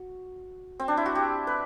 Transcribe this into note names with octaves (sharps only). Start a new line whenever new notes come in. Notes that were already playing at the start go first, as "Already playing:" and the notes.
Already playing: F#4
C4
D4
E4
F#4
G4
B4